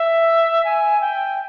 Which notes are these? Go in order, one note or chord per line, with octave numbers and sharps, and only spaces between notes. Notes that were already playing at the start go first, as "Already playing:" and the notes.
Already playing: E5
G#5
G5